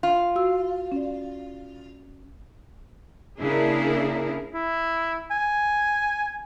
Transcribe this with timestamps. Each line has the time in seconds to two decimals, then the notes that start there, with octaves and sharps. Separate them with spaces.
0.03 F4
0.36 F#4 E6
0.92 C#4 D5
3.39 C#3 A#3 D4 E4 G#4 A#4
4.54 E4
5.31 G#5